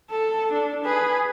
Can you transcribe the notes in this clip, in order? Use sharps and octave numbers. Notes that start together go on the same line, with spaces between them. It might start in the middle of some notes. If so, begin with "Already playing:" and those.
A4
D4
G#4 B4